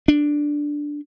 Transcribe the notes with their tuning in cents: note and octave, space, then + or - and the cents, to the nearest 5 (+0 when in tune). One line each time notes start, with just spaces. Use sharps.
D4 +0